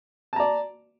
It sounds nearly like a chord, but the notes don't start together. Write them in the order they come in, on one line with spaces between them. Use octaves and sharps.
A5 A#5 D5